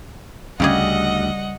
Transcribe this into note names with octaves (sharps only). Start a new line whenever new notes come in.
D2 C#3 G3 G4 G#4 D#5 F#5